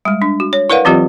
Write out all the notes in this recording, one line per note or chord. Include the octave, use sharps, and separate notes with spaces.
G3 G#3
D4
F#4
C#5
E4 A#4 B4 D5 F5 F#5
E3 F#3 C4 F4 G4 D#5